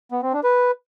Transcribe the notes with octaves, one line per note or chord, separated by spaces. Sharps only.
B3
C4
D4
B4